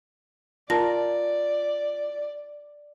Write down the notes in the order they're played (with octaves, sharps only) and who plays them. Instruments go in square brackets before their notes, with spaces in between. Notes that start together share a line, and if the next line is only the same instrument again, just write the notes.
[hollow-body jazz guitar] F4 A#4 [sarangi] D5 [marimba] A5 A#6